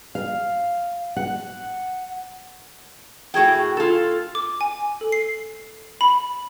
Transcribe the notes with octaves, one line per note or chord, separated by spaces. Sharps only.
F5
F#5
A2 F#4 G#4 G5
F4 A4
D6
G#5
A4
C7
B5